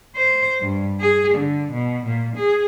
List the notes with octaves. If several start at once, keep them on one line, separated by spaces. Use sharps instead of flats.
C5
G2
G#4
D3
B2
A#2
G#4